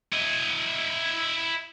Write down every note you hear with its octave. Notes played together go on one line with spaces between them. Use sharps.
E4 D#5